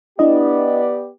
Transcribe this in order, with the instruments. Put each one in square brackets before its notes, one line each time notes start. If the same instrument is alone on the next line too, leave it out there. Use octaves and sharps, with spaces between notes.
[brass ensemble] B3 G4 D5 [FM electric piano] D4 E4 D#5